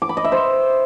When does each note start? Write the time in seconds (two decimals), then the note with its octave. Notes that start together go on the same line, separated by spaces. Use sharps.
0.02 D6
0.09 B5
0.17 D#5
0.24 E5
0.32 C5